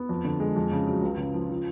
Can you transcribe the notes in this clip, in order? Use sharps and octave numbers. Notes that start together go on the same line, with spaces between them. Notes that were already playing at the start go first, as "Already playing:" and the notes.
Already playing: B3
F2
D3
G#3
F2
C#3
F#3
C#2
C#3
F3
F3